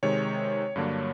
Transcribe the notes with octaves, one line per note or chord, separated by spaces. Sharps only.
C3 D#3 G#3 C#5
G2 D3 F#3 A#3 D4